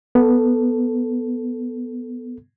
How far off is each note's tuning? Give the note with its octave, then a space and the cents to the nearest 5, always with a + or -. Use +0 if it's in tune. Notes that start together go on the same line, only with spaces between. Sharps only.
B3 +0 A4 +0